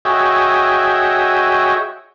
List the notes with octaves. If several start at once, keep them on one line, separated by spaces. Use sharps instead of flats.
F#4 G#4 C#5 D#5 E5 G5